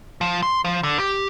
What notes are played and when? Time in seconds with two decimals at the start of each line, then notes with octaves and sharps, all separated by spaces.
0.21 F3
0.43 C6
0.65 F3
0.83 D3
0.99 G4